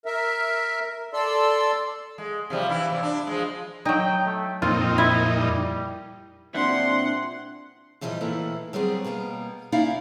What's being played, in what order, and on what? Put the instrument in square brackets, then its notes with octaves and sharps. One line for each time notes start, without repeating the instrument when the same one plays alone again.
[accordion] A#4 E5
A4 D5 C6 E6
[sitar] G#3
C3 F3 G3
E3 E4
A2 C3 G3
D4
F3 G#3
[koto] F#3 D#4 [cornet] G5
[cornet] A3
[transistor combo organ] F2 A#2 D#4 [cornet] C4 [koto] F4
[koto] E4
[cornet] G3
[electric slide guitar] A#2 C4 E4 [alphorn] D4 [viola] F#5 C6
[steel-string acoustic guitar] A#2 E3 F3 G3 C#5 D#5
A2 E3 A#3 E4 A4
F#3 G3 B3 C4 G#4 A#4
B2 G3 A#3 B3
A#3 C#4 D#4 E4 D5 F5